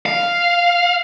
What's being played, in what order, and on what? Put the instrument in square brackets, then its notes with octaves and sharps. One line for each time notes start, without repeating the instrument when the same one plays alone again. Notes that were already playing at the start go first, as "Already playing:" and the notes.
[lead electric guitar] F5